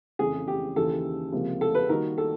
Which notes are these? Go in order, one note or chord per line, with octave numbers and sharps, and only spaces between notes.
F2 C#3 E3 A3 G#4
G4
D#2 C#3 E3 A4
C#2 C3 F3 A#3
A4
B4
D#3 G3 A#3 D#4 F#4 A#4
A4